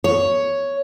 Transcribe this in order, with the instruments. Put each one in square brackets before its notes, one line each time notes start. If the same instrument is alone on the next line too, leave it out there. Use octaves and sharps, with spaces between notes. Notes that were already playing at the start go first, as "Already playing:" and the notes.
[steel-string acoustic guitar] C#5